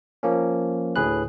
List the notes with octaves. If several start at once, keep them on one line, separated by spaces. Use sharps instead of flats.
F3 A#3 C#4
D2 A2 G#4 B4 F#6